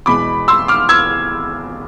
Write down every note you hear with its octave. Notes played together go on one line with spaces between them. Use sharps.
E2 B2 G#3 B5 D6
C6 E6
D6 F6
E6 G#6